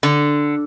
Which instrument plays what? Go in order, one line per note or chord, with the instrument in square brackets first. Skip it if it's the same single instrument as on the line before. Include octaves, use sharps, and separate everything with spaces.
[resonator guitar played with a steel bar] D3